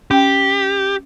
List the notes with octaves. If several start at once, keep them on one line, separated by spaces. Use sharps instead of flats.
C#4 G4 G5